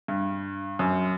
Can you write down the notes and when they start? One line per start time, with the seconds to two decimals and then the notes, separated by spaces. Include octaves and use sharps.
0.08 G2
0.79 F#2